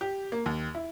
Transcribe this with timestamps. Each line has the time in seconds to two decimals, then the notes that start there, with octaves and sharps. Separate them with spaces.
0.01 G4
0.32 A#3
0.46 D#2
0.75 E4